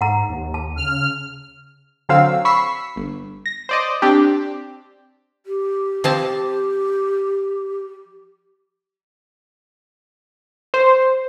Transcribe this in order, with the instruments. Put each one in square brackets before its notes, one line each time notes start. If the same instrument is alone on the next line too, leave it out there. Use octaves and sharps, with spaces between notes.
[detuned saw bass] G#2 [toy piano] F#5 A#5
[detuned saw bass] D#2
[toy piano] A5
[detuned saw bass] C#3 [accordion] F6
[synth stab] D3 F#3 C4 F5 E6
B5 C#6 E6 B6 C7
G1
A#6
C5 D5 D#5
C4 D4 G4
[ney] G4
[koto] F3 C4 A5
[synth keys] C5